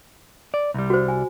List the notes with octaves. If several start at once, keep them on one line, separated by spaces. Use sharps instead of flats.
D5
C2 G3
F#4 C5
G#5